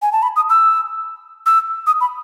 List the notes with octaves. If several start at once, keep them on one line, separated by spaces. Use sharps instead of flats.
G#5
A5
B5
D#6
E6
E6
D#6
B5